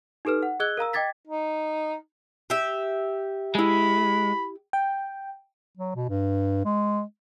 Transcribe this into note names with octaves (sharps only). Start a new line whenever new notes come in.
D#4 G4 A4 B4 F6
F#5
G#4 D#5 E6 F#6 G#6 G7
A#4 F5 A#5 E6
D#5 G5 D6 G#6 A6 B6
D#4
G4 E5
G#3 E4 G#5 B5
G5
F#3
B2
G2
G#3